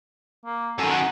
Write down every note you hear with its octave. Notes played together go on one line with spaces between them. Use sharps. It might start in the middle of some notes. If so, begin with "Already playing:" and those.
A#3
F#2 D#3 A4
F#5